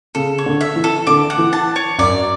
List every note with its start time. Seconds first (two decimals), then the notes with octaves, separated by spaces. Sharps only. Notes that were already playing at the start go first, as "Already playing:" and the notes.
0.15 C#3 A4
0.38 C#5
0.46 D3
0.61 E5
0.76 E3
0.84 A4
1.07 D3 D6
1.30 F#5
1.38 E3
1.53 A5
1.76 C#5
1.98 F#2 D5